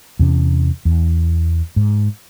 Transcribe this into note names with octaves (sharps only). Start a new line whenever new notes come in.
E2 C3 C#4
E2
G#2